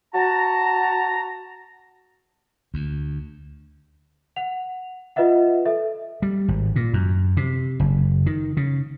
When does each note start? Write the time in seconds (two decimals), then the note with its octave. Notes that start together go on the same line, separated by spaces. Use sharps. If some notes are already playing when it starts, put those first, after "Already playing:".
0.14 F#4 A5 A#5
2.74 D2
4.36 F#5 F7
5.16 F4 B4 D#5 E5 F#5
5.66 A4 E5
6.22 G3
6.48 G#1
6.76 A#2
6.93 F#2
7.37 C3
7.80 F#1
8.26 D#3
8.57 C#3